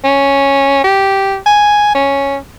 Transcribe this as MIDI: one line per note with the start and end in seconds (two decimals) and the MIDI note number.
0.04 0.82 61
0.84 1.37 67
1.46 1.91 80
1.95 2.37 61